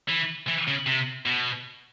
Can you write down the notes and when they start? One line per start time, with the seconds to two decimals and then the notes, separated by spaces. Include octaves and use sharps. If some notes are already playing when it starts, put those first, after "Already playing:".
0.08 E3
0.47 E3
0.67 C#3
0.86 C3
1.25 B2